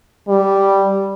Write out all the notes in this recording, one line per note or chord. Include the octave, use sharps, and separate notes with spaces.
G3